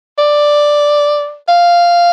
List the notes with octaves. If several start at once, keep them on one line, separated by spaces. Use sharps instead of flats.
D5
F5